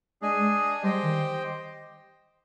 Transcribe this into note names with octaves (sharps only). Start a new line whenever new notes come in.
G#3 D4 G#4 D#5 G#5
G3 G4 C5 D#5 G5
D#3